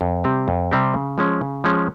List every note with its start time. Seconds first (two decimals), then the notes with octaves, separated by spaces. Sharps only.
0.01 F2
0.24 C3 G3 C4 G4
0.48 F2
0.71 C3 G3 C4 G4
0.94 C#3
1.18 F3 G#3 C#4
1.41 C#3
1.64 F3 G#3 C#4